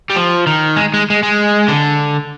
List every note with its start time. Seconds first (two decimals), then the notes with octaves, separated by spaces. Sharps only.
0.10 G3
0.16 F3
0.47 D#3
0.76 G#3
0.94 G#3
1.10 G#3
1.23 G#3
1.68 D3